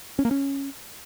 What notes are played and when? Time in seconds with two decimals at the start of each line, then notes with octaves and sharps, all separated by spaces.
0.19 C#4
0.25 A#3
0.31 C#4